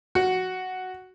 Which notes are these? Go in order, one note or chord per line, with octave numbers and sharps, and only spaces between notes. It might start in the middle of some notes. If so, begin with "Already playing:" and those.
F#4